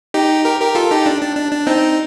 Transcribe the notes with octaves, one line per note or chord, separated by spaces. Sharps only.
D#4 G4
G4 A#4
G4 A#4
F4 A4
D#4 G4
D4
D4
D4
D4
C4 D#4